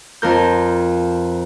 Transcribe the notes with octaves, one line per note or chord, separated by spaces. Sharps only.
F2 F3 A#4 G6